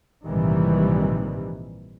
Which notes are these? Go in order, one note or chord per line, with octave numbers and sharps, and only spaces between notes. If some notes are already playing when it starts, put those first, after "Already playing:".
A#1 G#2 C3 D#3 E3 G3